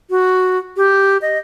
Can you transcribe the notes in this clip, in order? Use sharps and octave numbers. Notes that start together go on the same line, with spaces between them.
F#4
G4
D#5